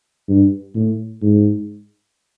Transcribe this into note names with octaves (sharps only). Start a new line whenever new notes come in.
G2
A2
G#2